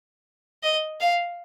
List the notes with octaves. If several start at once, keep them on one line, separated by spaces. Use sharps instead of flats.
D#5
F5